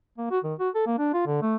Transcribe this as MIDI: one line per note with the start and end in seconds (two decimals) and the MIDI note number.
0.18 0.28 58
0.31 0.39 66
0.44 0.54 51
0.59 0.69 66
0.75 0.83 69
0.86 0.96 58
0.99 1.11 62
1.14 1.24 65
1.26 1.38 50
1.42 1.56 57